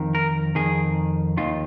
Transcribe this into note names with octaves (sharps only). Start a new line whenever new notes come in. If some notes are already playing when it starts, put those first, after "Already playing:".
Already playing: F2 D#3
A#4
F2 D#3 G#4
D#2 D#3 F4